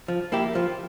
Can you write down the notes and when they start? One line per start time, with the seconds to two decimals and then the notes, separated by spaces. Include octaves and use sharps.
0.08 F3
0.32 A#3 E4 G4
0.55 F3